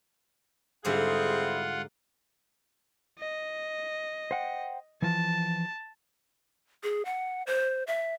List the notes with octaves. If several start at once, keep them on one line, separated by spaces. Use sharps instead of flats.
G#2 D3 G3 C4 E4 F4 G#4 F#5
D#5
C5 F#5 G5
E3 F3 A5
G#4
F#5
C5
E5